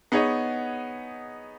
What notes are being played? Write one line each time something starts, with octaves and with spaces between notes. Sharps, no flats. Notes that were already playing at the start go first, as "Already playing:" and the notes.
B3 D#4 G#4 C#5